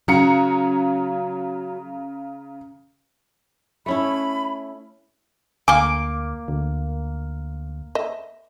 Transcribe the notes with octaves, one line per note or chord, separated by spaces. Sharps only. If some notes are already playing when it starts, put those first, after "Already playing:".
C#3 F#3 A#5 C#7
A3 C#4 E4 B5
D2 A#3 G#5 D6
D2
D#5 E5